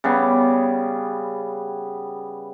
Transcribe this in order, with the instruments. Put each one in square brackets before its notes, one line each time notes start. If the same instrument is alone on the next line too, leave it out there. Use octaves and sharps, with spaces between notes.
[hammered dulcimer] C#3 G3 B3